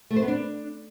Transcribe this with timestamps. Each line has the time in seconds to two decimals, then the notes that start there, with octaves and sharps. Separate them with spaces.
0.10 A3
0.16 C5
0.22 B3
0.28 D4